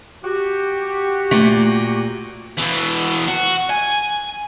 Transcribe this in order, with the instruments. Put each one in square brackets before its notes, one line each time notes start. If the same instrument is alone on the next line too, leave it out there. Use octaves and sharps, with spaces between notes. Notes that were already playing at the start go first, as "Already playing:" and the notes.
[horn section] F#4 G4
[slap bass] A#2 [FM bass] A3
[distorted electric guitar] B2 E3
F#4
G#5